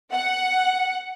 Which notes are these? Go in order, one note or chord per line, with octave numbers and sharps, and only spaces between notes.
F#5